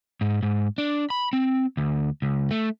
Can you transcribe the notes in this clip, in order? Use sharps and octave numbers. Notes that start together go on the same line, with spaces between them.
G#2
G#2
D4
B5
C4
D2
C#2
A3